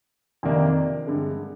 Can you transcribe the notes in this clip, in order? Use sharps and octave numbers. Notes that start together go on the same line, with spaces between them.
F2 C3 D#3 A#3 D4
G2 D3 G#3